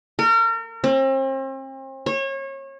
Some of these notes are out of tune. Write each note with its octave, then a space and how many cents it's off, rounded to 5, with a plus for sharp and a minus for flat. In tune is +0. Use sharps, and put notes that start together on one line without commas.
A#4 -35
C4 +40
C#5 -30